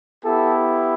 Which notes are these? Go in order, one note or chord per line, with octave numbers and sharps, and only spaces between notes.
B3 E4 G4 A4